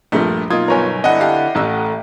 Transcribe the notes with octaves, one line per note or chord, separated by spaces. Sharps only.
A#1 G2 F3 A3
B1 A#3 D#4 F4 D#6 G#6
G1 B3 A#4 C#5 G#5
D3 D4 E4 D#5 F#5
G4 F5 A5
A1 A3 E6